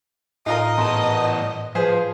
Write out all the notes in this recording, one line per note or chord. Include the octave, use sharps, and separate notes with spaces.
A2 D#4 F4 A#4 D#5
E2 G#2 B3 A#4 A5
F3 G#4 B4 C5